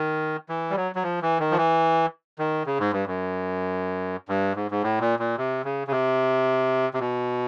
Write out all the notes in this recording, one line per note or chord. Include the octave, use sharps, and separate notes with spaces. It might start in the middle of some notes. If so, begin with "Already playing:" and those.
Already playing: D#3
E3
G3
F#3
F#3
F3
E3
D#3
F3
E3
D#3
C#3
G#2
G2
F#2
G2
G#2
G#2
A2
A#2
A#2
C3
C#3
C#3
C3
C3
B2